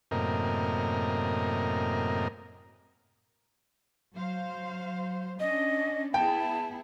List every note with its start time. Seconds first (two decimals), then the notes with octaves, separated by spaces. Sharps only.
0.11 F#2 A2 C3 A#3 A#4 D#5
4.14 F#3 C5 F5
5.40 C#4 D4 D#5
6.14 B3 E4 G#4 G5 A5